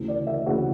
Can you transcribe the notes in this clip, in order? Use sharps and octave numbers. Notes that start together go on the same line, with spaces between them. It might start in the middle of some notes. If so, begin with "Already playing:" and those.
Already playing: D2 C#3 E3
D5
E5
D2 C#3 E3 F#4